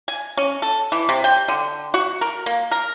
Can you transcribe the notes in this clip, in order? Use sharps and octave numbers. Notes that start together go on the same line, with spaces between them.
G#5
C#4
A4
E3
C3
G5
D3
F#4
A#4
A#3
A#4